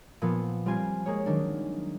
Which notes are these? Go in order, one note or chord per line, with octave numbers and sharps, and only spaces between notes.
A#2 F3 B3
G3 C4 F4 G#5 C7
G#3 A#3 G#4 C#5
D#3 F#3 D4